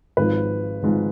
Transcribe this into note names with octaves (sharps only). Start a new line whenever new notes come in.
G#1 G#2 F3 B4
G#1 G#2 F3